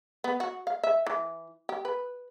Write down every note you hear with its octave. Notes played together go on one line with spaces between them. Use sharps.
B3
F#4
F5
E5
E3
G4
B4